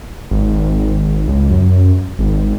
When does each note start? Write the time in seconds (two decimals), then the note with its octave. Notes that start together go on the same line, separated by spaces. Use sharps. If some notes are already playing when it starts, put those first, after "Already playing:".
0.31 G#1
1.27 C#2
1.50 F#2
2.19 G#1